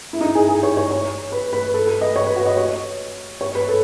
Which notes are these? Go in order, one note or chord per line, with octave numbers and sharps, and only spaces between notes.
E4
D#4
G#4
G#4
C#5
C#5
C#5
B4
B4
A4
B4
D#5
C#5
B4
F#4
D#5
C#5
C#5
B4
A4